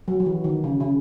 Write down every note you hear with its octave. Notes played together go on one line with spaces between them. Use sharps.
F#3
F#3
E3
D#3
C#3
C#3